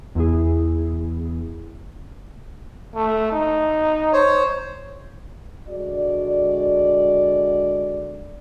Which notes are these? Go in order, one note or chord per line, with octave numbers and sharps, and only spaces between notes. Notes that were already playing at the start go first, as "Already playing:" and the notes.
E2 E4 G#4
A3
D#4
C5 C#5
D3 G#3 F#4 D5